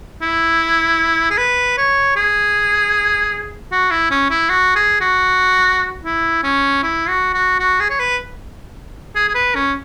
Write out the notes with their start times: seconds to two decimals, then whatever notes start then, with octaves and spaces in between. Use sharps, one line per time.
0.21 E4
1.30 G#4
1.38 B4
1.78 C#5
2.16 G#4
3.72 F#4
3.91 E4
4.11 C#4
4.30 E4
4.49 F#4
4.76 G#4
5.01 F#4
6.04 E4
6.43 C#4
6.83 E4
7.08 F#4
7.34 F#4
7.60 F#4
7.80 G#4
7.90 C#5
8.00 B4
9.15 G#4
9.29 G#4
9.35 B4
9.55 C#4